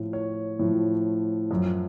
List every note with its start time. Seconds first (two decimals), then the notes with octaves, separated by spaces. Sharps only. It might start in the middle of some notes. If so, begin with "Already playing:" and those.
Already playing: A2 F3
0.13 C#5
0.59 A2 F3
1.51 F#2 F3